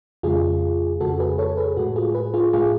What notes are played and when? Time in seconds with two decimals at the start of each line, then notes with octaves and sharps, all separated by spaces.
0.23 F2 C#3 G#3 F4 G#4
1.00 F2 C#3 G#3 F#4 A4
1.20 G#4 B4
1.38 A4 C#5
1.57 G#4 B4
1.77 A2 G#3 F#4 A4
1.96 F4 G#4
2.14 G#4 B4
2.34 F4 G#4
2.53 A2 G#3 F4 G#4